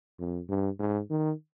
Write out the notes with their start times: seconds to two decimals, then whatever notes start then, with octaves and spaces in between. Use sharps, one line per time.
0.19 F2
0.49 G2
0.79 G#2
1.10 D#3